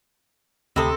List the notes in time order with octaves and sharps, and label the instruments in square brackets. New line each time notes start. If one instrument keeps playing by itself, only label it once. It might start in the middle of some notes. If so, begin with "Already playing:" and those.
[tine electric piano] D2 B5 D#6 [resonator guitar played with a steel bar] C3 [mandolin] C4 A4